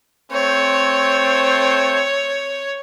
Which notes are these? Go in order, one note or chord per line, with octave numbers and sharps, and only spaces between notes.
A3 C4 C5 C#5